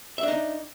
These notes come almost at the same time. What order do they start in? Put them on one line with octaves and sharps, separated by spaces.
E5 D4 D#4